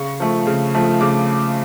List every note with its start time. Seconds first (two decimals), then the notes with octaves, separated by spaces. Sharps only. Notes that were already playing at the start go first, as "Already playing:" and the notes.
Already playing: C#3 C#6
0.20 F3 A3
0.47 C#3
0.75 F3 A3
1.01 C#3 D6